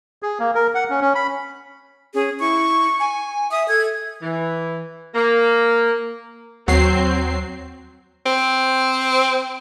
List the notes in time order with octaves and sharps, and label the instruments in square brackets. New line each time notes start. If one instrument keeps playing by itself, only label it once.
[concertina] G#4
A#3
A#4
F#5
C#4
C#4
B5
[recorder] C#4 [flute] G#4
[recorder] E4 [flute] C#6
[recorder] G#5
[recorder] E5 [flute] D#6
[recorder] A4 [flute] G#6
[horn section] E3
A#3
[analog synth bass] D#2 [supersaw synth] F#3 C7 [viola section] C4
[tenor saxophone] C4